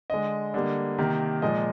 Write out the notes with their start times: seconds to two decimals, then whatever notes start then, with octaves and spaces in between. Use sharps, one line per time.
0.10 D3 G#3 D#5
0.54 D3 G3 A#3
0.98 C3 D#3 A#3
1.42 A#2 F3 G#3 D#5